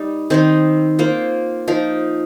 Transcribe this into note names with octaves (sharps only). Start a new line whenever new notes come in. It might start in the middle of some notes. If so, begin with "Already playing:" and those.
Already playing: G3 D#4
D#3 C4 D#4 C5
A#3 F4 C5
F3 D#4 A#4